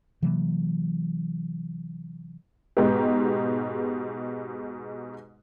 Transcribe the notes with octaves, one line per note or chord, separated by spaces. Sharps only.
C3 E3 F#3 A#3
G#2 B2 G#3 B3 D#4 G4